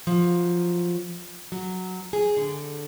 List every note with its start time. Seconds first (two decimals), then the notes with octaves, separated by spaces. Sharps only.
0.07 F3 F#3
1.52 F#3
2.13 G#4
2.37 D3